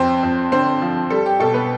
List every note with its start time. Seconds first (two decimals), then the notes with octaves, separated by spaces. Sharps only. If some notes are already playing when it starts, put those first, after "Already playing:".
Already playing: F2 C4 C5
0.23 F2
0.52 D3 C4 C5
0.82 F3
1.10 G3 A4
1.26 G4
1.40 B2 A4
1.54 B3 B4